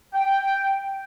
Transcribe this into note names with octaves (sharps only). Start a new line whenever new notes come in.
G5